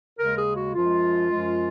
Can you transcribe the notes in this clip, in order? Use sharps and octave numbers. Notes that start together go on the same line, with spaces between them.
D#2 C#3 G#3 A#4
G#4
F#4
F#2 F3 G#3 F4
F#2 F3 G#3